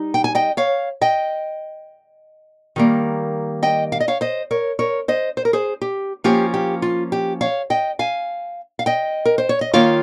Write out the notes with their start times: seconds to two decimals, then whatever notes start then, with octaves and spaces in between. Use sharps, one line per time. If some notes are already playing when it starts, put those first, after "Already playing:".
Already playing: G3 D#4
0.14 G5
0.24 G#5
0.35 D#5 G5
0.57 C#5 F5
1.01 D#5 G5
2.76 D#3 G3 A#3
3.63 D#5 G5
3.92 F5
4.00 D#5
4.08 C#5 F5
4.21 C5 D#5
4.51 A#4 C#5
4.79 A#4 C#5
5.08 C5 D#5
5.37 C5
5.45 A#4
5.53 G#4 C5
5.81 G4
6.24 F3 A#3 C#4 F4 G4
6.54 G4
6.82 F4
7.12 G4
7.41 C#5 F5
7.70 D#5 G5
7.99 F5 G#5
8.79 F5
8.86 D#5 G5
9.25 A#4
9.38 C5
9.49 C#5
9.61 D#5
9.73 D#3 A#3 F4 C#5 F5